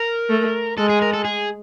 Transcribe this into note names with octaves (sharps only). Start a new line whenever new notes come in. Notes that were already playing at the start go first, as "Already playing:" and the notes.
Already playing: A#4
A3
G#3 A4
G#4
A#4
A4
G#4